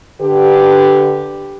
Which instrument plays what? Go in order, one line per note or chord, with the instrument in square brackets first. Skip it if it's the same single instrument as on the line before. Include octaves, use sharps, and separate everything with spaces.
[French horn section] D3 G4 B4